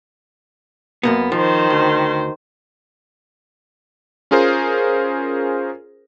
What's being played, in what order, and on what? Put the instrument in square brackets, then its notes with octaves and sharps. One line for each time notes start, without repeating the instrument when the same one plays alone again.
[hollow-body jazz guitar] F#2 A#3 B3
[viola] D#3 C5 [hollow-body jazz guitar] F3
[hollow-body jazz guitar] D2
[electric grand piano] C#4 F4 G#4 A#4 C5